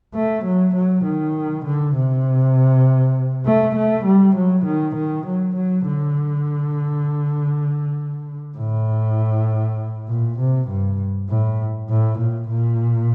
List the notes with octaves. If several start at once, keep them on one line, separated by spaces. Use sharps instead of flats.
A3
F#3
F#3
D#3
D3
C3
A3
A3
G3
F#3
D#3
D#3
F#3
F#3
D3
A2
A#2
C3
G2
A2
A2
A#2
A#2